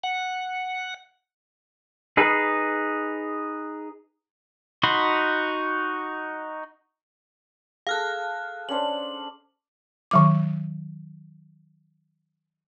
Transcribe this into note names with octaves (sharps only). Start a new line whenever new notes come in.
F#5
D#4 G#4 B4
D#4 F#4 B5 C6
G#4 A4 F5 F6 F#6
C#4 D4 C5 F#7
D#3 F#3 D6